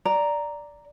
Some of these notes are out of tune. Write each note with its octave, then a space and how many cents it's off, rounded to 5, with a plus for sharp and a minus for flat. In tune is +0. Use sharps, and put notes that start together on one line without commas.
D5 +0 A#5 +0